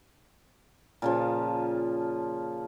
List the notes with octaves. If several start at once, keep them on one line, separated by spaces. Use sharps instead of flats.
A#2 C#3 F3